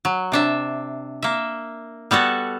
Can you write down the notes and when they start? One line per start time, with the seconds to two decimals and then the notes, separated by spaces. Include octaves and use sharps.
0.05 F#3
0.32 C3 D4 E5
1.22 A#3 E5
2.11 G3 B3 F#4 A4